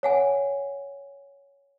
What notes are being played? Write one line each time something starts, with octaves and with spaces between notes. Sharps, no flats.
C#5 F#5 G#5